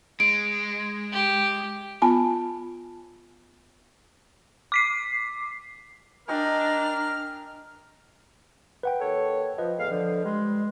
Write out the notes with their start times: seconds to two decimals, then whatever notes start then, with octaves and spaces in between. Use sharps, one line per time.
0.20 G#3 D7
1.12 G4
2.02 B3 F4 G#5 A5
4.72 D6 B6 C7
6.28 D4 A#4 D#5 G5 G#5 F6
8.83 B4 F#5 G5
9.01 D#2 A4 C#5
9.58 F3 B4 D#5
9.78 E2 A2 F5
9.90 D3 F3
10.25 G3 G#3